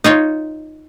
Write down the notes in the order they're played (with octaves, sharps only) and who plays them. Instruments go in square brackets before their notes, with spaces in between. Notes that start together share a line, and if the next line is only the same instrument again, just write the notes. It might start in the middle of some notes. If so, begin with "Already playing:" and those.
[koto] D#4 F4 C#5